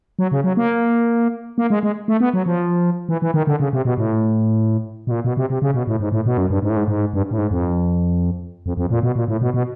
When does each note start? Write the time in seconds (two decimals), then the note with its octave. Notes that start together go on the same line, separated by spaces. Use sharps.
0.19 F#3
0.32 C#3
0.44 F#3
0.57 A#3
1.58 A#3
1.70 G#3
1.83 G#3
2.08 A3
2.20 B3
2.34 F#3
2.46 F3
3.09 E3
3.22 E3
3.34 D#3
3.47 D3
3.60 C#3
3.73 C3
3.85 B2
3.98 A2
5.07 B2
5.11 A#2
5.25 B2
5.37 C3
5.50 C3
5.62 C#3
5.74 B2
5.87 A2
6.00 G#2
6.12 A2
6.26 B2
6.38 F#2
6.50 G2
6.63 G#2
6.70 A2
6.76 G#2
6.88 G#2
7.14 G2
7.31 A2
7.38 G#2
7.51 F2
8.66 F2
8.77 F2
8.90 A#2
9.03 B2
9.16 A#2
9.28 A2
9.41 B2
9.54 B2